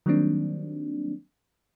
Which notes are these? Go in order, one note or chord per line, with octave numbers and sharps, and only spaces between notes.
D#3 F#3 G3 A#3 C4 D4